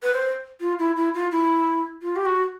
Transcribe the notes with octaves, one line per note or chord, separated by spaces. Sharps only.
B4
C5
F4
E4
E4
F4
E4
F4
G4
F#4